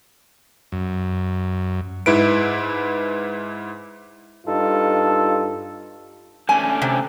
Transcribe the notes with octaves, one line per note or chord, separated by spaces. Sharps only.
F#2
G#2 E4 B4 D7
G2 D#4 F4 A4
A3 C#4 D4 G#5
C3